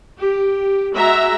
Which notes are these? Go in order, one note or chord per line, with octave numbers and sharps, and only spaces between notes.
G4
G#3 F#4 E5 A#5